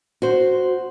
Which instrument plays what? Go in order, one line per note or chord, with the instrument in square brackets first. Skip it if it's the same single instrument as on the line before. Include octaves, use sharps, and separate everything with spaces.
[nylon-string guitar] F#4 C5